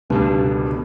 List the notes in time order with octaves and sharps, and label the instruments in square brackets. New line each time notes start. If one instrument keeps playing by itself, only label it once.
[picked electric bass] C#2 B2 D3 [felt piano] G2